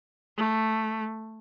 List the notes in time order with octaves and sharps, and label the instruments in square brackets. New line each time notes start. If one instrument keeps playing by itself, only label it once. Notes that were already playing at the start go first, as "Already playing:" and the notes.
[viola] A3